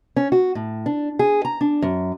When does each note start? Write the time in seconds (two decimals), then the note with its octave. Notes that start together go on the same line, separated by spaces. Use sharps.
0.16 C#4
0.32 F#4
0.55 A2
0.86 D4
1.19 G#4
1.45 A#5
1.61 D4
1.82 F#2